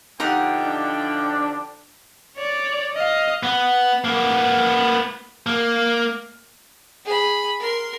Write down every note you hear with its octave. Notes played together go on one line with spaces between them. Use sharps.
D3 F3 D#4 G4 F#5 G5
D4
C#5 D5
D#5 F5
B3
A#3 B3
A#3
G#4 B5
A#4 C6